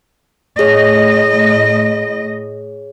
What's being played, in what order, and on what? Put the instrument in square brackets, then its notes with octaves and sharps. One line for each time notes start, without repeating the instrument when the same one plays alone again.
[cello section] A2 D#5 [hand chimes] G#4 C#5